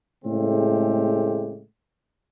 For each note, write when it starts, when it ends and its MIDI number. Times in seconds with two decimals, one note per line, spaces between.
0.25 1.62 45
0.25 1.62 49
0.25 1.62 56
0.25 1.62 57
0.25 1.62 60
0.25 1.62 67